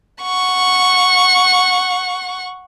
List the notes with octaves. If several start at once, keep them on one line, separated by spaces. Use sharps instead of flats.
F#5 C#6